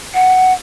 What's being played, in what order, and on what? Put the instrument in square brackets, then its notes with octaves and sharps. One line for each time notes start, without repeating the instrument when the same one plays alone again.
[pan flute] F#5